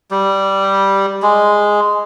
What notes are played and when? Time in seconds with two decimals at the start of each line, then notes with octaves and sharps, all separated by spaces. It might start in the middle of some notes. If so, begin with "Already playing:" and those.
0.11 G3
1.23 G#3